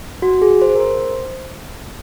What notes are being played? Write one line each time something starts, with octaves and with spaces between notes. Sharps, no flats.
F#4
G#4
C5
A#4
C5